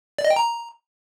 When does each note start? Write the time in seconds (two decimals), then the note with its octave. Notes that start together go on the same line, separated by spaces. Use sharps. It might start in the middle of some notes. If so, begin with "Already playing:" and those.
0.19 D5
0.24 D#5
0.30 G5
0.36 A#5